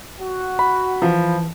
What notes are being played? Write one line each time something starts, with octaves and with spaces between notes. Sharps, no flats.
F#4
B5
E3 F3